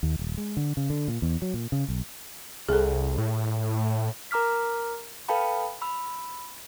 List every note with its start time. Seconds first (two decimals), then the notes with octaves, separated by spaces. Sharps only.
0.03 D#2
0.19 D#1
0.37 G#3
0.57 D3
0.77 C#3
0.90 D3
1.08 A#2
1.22 E2
1.42 F#3
1.54 A#2
1.72 C#3
1.88 B1
2.69 C2 G#4 A4
3.18 A2
4.31 A#4 A#5 D6 F6 B6
5.29 A4 B4 F5 G5 A5 B5
5.82 B5 E6